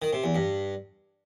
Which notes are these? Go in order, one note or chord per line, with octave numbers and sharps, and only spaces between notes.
D#3
C3
E2
G2